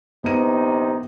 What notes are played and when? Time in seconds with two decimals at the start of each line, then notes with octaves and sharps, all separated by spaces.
0.24 A#1 C3 B3 D#4 A#5 D#7